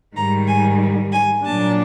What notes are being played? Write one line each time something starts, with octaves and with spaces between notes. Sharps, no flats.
G#2 D#3 G3 A#5
G#5
G#5
A#2 F#3 A#3 D4 A5